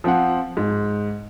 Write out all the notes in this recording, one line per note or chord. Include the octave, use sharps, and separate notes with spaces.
F3 C4 F#5
G#2